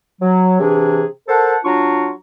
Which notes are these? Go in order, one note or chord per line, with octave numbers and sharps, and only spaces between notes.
F#3
C3 E3 D4 G#4
A4 A#4 C5 F#5 A5
F#3 D4 F4 A#5 C#6